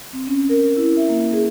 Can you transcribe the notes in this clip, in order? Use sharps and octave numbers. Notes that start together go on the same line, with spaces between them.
C4
C#4
A#4
E4
E5
A#3
G#4